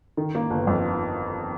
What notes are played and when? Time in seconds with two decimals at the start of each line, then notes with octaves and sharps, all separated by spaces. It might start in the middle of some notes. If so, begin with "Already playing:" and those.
0.17 D#3
0.35 A#3
0.50 G1
0.67 F2